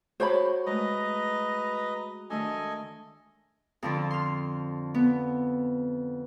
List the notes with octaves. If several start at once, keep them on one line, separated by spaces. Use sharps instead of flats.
F#4 G4 C5 C#5 B5 D6
G#3 A3 B4 D#5 A#5
D#3 A3 D4 A4 D#5 G#5
F2 D3 F3
C6 F6
B3